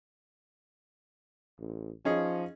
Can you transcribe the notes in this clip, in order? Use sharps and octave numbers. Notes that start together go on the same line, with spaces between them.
A1
F3 C#4 D#4 G#4